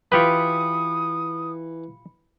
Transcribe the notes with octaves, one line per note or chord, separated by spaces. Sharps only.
E3 F4 G4 B4 B5 D#6 C#7